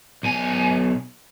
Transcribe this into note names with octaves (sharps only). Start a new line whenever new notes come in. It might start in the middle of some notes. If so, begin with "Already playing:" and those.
B1 G#5